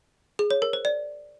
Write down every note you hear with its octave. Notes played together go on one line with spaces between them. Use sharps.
G#4
C#5
A#4
C5
D5